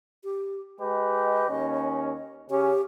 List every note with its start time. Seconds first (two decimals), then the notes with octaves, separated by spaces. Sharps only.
0.24 G4
0.80 G#3 G4 B4 D#5
1.48 D#2 C#4
2.50 C#3 C#4 G4